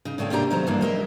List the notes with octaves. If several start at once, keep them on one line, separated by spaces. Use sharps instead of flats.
C#3 D#4
A#2 C#3 A3 C#4 G5
C3 A#3 C#4 D4 G4 A#5
D#3 F#3 A3 B3 C5 A#5
G2 D3 E3 A#3 D4 D#4
G#3 A#4 D#5 E5